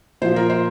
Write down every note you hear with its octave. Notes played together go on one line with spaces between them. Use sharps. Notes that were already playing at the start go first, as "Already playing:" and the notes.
A#2 F3 C5
A#4
C5